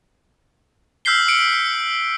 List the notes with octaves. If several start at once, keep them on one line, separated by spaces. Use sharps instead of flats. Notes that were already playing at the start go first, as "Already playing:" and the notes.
E6 F6 G6 B6 C7 G7
E6 C#7 D7